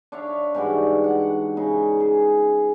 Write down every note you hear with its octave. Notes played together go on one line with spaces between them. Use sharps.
D4 C#5 E5 F5
G#2 E3 G3 F#4
F#5
C#3 D#4
G#4